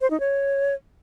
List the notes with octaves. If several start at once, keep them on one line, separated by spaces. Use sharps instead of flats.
C5
D#4
C#5